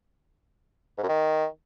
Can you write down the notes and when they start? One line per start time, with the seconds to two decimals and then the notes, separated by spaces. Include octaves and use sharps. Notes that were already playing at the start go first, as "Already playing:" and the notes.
0.98 G#2
1.03 F#2
1.09 D#3